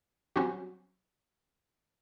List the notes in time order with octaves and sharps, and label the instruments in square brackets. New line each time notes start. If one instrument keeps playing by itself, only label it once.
[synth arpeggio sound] F#3 G3 C4 C#4 F#4